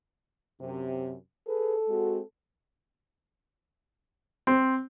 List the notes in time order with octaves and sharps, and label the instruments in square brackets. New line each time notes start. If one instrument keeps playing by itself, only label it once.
[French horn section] F#2 C3
[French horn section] G#4 B4 [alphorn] A4
[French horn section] G#3 C4 F#4
[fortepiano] C4